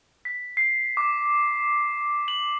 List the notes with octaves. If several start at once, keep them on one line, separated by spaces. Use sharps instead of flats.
B6
C7
D6
F#7